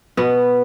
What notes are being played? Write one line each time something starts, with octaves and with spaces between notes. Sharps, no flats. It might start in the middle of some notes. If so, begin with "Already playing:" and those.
B2 B3